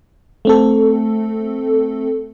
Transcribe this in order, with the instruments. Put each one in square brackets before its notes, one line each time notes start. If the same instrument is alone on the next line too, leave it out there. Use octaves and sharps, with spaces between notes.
[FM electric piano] A3 C4 A4